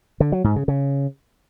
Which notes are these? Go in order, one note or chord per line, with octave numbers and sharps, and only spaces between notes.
D3
F#3
G#2
C#3
C#3